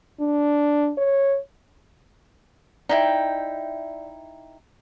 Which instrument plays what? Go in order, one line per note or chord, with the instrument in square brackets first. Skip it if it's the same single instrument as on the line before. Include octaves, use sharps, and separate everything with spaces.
[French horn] D4
C#5
[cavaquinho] D#4 E4 G5 [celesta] D5 E5